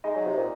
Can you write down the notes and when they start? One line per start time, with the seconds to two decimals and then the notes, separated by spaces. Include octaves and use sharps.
0.04 G#3 D#4 D#5
0.15 F#3
0.26 C3
0.37 A#2